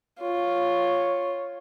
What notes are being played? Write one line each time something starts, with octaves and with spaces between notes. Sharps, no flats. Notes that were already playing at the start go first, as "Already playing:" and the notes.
F4 C#5